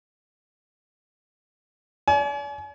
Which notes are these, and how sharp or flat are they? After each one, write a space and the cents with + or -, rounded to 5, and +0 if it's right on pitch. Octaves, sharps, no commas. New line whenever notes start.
D5 -40 G#5 +40